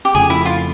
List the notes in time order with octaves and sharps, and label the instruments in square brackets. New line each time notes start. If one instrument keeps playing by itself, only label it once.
[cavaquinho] G4
[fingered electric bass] F2 C#3 F3 A3 [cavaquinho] G#4
[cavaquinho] E4
F4